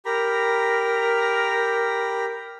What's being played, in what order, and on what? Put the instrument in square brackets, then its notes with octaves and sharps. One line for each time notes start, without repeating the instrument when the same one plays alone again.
[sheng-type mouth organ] G4 A#5 B5 [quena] A#4